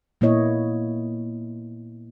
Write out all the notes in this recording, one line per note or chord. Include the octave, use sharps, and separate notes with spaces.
A#2 A#3 B3 E4 C#5 D#5